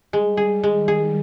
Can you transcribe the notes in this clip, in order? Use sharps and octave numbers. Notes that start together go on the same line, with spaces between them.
G3 G#3
G#4
D#3 G#3
G#4